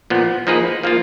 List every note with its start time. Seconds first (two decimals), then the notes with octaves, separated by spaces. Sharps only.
0.10 A#2 F3 B3
0.47 F3 A#3 D#4 G#4 B4
0.83 F3 A#3 F4